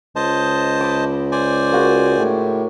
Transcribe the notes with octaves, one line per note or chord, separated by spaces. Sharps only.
C#2 C5 D#5 A5
B5 D6
C5 D5 G#5
A#3 F#4 G#4
A2